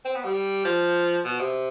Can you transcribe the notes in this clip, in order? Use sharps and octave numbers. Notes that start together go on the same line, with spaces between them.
C4
B3
G3
F3
B2
C3